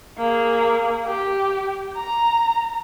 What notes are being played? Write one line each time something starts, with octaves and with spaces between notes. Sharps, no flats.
A#3 G#4
G4
A#5